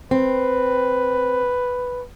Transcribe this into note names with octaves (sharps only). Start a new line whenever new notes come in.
C4 B4